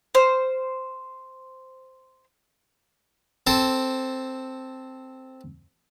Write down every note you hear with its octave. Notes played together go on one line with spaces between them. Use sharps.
C5 F6
C4 A4 C5